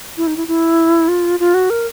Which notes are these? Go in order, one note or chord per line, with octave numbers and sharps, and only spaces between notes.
E4
D#4
E4
E4
F4
F4
F#4
A#4